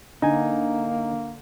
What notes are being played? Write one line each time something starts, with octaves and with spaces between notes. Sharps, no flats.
D3 A#3 D#4 G#5